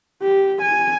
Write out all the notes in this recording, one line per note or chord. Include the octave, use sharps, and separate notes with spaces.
G4
G#5